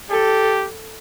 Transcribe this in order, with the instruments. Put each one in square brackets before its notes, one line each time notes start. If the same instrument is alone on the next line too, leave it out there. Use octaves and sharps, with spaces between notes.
[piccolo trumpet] G4 [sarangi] A4